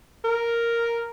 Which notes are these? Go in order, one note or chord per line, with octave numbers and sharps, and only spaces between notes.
A#4